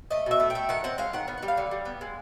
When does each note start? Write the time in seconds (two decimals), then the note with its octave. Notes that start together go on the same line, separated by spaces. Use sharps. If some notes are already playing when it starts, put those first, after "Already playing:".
0.11 A3 D#5
0.26 B2 E5
0.40 A3
0.50 G5
0.55 A3
0.69 D#3 F#5
0.84 C4 F#5
0.98 G#3 F5
1.13 D#3 F#5
1.28 B3 F5
1.38 G3 F#5
1.48 F5
1.57 D3
1.71 G3
1.85 B3
2.01 G#3